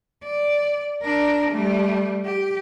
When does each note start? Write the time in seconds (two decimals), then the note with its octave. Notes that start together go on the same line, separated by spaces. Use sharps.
0.24 D5
1.02 D4 A#4
1.50 G3 A3
2.25 G4